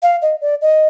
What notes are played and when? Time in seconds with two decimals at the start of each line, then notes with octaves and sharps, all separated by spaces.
0.02 F5
0.22 D#5
0.41 D5
0.62 D#5